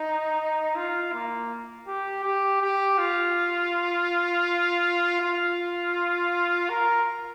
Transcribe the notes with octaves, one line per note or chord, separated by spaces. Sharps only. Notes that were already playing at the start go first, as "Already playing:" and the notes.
Already playing: D#4
F4
A#3
G4
G4
G4
F4
F4
A#4